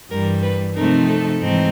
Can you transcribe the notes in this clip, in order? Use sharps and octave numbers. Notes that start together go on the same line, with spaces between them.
G2 E3 G3 A#4
B4
C3 F3 A3 C4 D#4 A#4
A4
G#2 E3 A3 C4 D#4